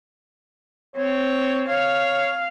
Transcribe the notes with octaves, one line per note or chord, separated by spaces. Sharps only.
C4 C#5
C#5 F5